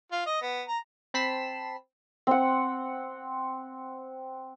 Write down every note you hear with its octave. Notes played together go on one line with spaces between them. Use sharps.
F4
D#5
B3
A#5
C4 A5 B5 B6 C7 E7
C4 F#5